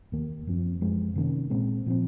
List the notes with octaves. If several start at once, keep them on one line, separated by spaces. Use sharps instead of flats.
D#2 D#3 A#3
F#2 F3 C4
F#2 F3 G#3
C3 D#3 A#3 C#4
A#2 G#3 C4
A#2 F3 C4